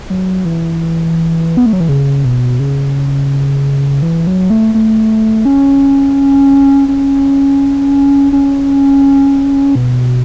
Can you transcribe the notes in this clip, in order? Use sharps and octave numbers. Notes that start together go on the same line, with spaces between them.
F#3
E3
B3
A3
F#3
E3
C#3
B2
C#3
E3
F#3
A3
A3
C#4
C#4
C#4
B2